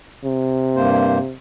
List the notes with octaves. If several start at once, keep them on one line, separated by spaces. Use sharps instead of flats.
C3
G2 A#3 C5